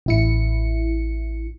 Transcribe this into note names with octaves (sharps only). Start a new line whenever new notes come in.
A1 E4 C#7